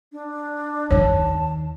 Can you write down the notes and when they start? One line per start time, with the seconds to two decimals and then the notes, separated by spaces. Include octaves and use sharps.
0.12 D4
0.91 D#2 D#3 C#5 A5